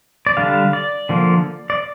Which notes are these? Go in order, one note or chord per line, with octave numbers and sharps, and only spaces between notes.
D5
D3 G3 D4 F5
D5
D3 F3 A#3
D5